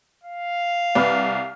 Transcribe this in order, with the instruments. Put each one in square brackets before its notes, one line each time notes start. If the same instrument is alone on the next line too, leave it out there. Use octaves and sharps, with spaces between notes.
[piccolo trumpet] F5
[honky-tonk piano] C2 B4 F6